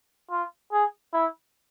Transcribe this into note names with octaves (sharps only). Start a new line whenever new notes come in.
F4
G#4
E4